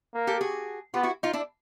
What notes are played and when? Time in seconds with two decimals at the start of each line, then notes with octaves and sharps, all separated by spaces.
0.14 A#3
0.27 G4 A4
0.41 F#4 G#4
0.94 B3 F4 G4
1.03 E4 F#4
1.23 D#4 F4
1.33 D4 E4